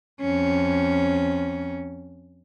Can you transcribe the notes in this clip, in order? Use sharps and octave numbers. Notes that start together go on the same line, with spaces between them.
F2 C#4